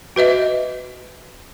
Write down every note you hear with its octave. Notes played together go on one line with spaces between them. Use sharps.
F#4 B4 D#5 E5